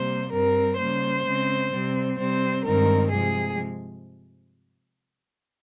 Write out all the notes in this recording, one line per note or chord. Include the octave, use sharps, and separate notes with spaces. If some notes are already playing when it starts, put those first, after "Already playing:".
Already playing: C3 G3 A#3 C5
G2 G3 C4 A#4
C#3 G3 A#3 C5
C#3 G#3 C4
C3 G3 C4
C3 G3 C4 C5
G2 D#3 G#3 C4 A#4
C3 F3 G#3 G#4